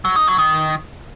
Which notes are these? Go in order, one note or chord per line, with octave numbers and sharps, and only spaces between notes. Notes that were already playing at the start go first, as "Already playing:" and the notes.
F#3
D#4
F#3
D#3